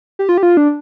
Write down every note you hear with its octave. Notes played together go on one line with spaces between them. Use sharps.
G4
F4
G4
F4
D4